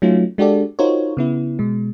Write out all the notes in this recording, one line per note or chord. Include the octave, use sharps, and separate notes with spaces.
F#3 A3 C#4 D#4 F4
G#3 D4 F#4 G4 A4 D5
D#4 F4 F#4 A#4 C5 C#5
C#3 B3 E4
B2 G#3